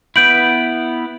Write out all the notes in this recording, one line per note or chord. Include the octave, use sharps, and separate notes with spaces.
B3 E4 G6 D7 F#7